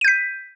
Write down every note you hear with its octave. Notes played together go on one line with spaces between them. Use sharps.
G6 B6 D#7